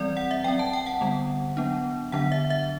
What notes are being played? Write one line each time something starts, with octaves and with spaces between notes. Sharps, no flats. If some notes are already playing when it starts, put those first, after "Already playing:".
Already playing: E3 G3 C4 D5
F#5
E5
F#3 C4 G5
A5
G5
F#5
D3 G3 B3
F#3 B3 D4
D3 F#3 B3 D4 F#5
E5
E5